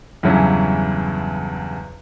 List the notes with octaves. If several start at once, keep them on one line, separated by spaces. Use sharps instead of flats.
E2 G2 C#3 E3 F#3 C#4